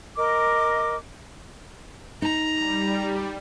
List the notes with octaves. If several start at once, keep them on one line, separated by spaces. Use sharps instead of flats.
A#4 D#5 D6
D#4 A#5
G3